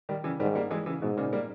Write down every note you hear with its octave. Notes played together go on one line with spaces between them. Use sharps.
D#3 G3
C#3 E3
G#2 D#3 G3
G3 A#3
E3 G#3
C#3 E3
G#2 B2
A#2 C#3
G3 A#3